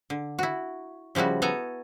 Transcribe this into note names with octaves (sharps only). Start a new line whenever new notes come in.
D3
E4 F#4
C#3 F3 G3 E4 F#4
B3 A4 G#5 A#5